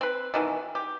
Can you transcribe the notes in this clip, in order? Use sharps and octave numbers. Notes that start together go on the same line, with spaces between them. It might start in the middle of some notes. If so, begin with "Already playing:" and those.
C4 B4
B2 D#3 E3
G4